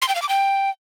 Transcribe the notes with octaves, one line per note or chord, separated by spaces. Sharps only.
C6
G5
F5
D6
G5